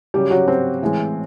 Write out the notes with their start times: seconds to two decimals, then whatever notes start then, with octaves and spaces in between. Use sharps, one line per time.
0.14 C#3 F#3 G3 G4
0.30 F#3 F#4
0.48 C4
0.82 A2 E3 G#3